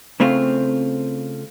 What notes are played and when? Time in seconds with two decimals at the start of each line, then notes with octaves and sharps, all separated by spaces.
0.20 C#3 A3 C4 F4